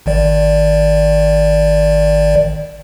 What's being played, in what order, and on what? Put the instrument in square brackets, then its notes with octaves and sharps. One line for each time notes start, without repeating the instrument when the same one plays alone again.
[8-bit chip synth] G#1 D#3 D5